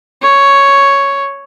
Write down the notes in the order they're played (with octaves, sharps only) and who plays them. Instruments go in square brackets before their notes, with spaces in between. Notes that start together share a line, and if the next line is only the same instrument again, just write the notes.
[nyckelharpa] C#5